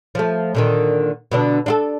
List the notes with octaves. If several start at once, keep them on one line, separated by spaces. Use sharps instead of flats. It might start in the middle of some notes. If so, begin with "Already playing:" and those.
F3 A3
A#2 D3 D#3
B2 D3 D4
D4 F4 A4